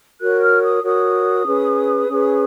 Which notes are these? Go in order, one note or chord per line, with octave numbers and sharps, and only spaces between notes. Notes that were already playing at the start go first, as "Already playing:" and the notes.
F#4 A#4 C#5 F#6
F6
D#6
F#4 A#4 C#5 D#6
C#4 G#4 B4
C#4 G#4 B4